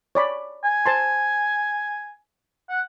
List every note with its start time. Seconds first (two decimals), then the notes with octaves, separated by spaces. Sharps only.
0.15 C#5 D5 B5
0.64 G#5
0.86 C5 A5 C6
2.70 F#5